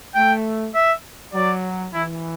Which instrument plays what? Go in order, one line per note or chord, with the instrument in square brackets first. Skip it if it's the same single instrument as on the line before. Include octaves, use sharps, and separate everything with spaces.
[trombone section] A3 [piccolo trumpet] G5
[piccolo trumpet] E5
[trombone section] F#3 [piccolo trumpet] D5
[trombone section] E3 [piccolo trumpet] E4